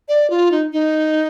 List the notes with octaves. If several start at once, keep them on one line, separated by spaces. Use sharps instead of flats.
D5
F4
D#4
D#4